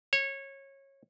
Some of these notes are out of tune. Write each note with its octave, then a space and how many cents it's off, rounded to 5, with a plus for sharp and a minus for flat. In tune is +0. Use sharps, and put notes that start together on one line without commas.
C#5 -20